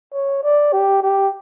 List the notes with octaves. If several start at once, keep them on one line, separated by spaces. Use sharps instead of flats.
C#5
D5
G4
G4